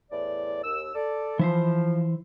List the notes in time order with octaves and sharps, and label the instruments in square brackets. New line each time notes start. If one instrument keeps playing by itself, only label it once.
[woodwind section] E2 A2 D5
D#2 E6
A4 D5
[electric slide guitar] E3 E4 C5 [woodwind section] F3